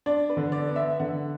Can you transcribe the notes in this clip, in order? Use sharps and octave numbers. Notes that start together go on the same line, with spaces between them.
D4 D5
B4
D3
D5
B3
E5
D3 F#5